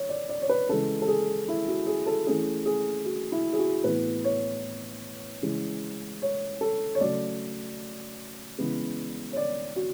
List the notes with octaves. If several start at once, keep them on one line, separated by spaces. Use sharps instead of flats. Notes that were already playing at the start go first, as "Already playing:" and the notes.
Already playing: C#5
D5
D5
C#5
B4
C#3 E3 G#3 A4
A4
G#4
E4
F#4
G#4
A4
E3 A3 C#4 G#4
G#4
F#4
E4
G#4
F#4
A2 E3 B3 B4
C#5
C#3 E3 G#3
C#5
A4
C#5
C#3 F#3 A3 D5
C#3 E3 G#3 B3
C#5
D5
F#4